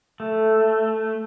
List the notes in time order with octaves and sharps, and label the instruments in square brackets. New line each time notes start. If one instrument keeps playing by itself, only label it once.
[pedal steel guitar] A3